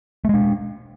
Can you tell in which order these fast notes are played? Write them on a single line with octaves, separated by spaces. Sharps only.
A3 G#3 D4